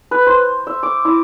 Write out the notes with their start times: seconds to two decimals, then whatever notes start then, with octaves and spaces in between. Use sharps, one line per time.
0.11 B4
0.27 C5
0.67 E5
0.83 D6
1.05 E4